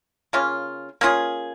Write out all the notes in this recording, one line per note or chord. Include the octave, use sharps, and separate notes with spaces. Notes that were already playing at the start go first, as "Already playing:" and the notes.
C#3 A#3 C#4 F4
A#3 C#4 F4 G#4